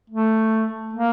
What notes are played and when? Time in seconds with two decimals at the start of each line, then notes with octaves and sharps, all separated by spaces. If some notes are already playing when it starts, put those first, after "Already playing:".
0.10 A3
0.93 A#3